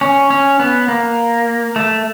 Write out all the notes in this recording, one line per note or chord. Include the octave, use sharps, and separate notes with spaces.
C#4
C#4
B3
A#3
A3